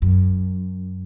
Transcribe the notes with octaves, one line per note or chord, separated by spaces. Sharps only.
F#2